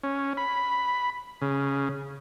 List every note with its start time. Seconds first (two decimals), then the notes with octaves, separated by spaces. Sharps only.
0.03 C#4
0.37 B5
1.41 C#3